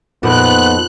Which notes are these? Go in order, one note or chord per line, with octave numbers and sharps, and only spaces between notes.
F2 A#2 D#3 B3 F#6